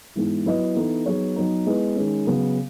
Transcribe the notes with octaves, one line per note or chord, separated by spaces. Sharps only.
G#2 E3 G#3 B3 E4
F#3 B3 E4 B4 D#5
E3 B3 D#4 A4
F#3 B3 D#4 G#4 C#5
F#3 B3 D#4
G#3 B3 E4 B4 D#5
D#3 G#3 C#4
C#3 F#3 B3